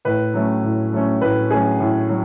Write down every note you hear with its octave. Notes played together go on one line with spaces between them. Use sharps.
A2 B4
F#3 A3 C#4
A2
F#3 A3 C#4
A2 B4
F#3 A3 C#4 G#4
A2
F#3